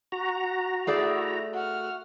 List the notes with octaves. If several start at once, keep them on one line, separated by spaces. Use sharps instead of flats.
F#4 A#5
A3 E4 G#4 D5
F#4 F6